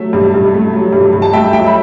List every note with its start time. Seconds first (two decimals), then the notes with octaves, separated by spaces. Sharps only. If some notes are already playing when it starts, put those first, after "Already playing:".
Already playing: F#3 A3 E5
0.13 G2
0.34 G2
0.54 A3
0.73 F#3
0.93 G2
1.13 G2
1.22 A5
1.33 A3 E5 G5
1.53 F#3 E5 G5
1.67 B5